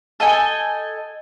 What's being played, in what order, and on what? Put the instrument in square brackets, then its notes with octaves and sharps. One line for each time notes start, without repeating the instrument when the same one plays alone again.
[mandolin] A4 D#5 G5 G#5